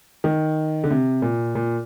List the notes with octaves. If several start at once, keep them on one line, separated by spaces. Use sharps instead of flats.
D#3
D3
C3
A#2
A#2